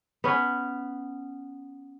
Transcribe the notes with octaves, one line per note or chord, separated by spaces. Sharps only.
B3 C#4